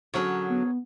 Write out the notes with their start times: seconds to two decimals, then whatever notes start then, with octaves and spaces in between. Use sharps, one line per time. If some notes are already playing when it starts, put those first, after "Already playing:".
0.14 D3 F#3 C#4 G#4 A#4 C#5
0.50 B3